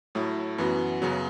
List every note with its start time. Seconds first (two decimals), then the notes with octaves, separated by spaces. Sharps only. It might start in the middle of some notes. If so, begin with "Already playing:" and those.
0.15 A2 F#3 A3 E4
0.58 F#2 E3 B3 F#4
1.02 F#2 C#3 F#3 B3